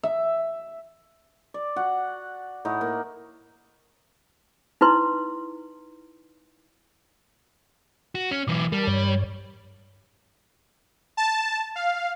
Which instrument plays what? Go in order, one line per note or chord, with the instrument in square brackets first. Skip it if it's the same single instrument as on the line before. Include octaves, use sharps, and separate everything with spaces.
[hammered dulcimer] E5
D5
F#4 F#5
A2 D#4 F#5
A#3
[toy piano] D#4 E4 B4 C6
[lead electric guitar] F#4
C#4
[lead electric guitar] B1 E3 [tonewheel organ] D6
[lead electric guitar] G3 [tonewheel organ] A#4 A5
[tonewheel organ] G2 C#5
[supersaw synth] A5
F5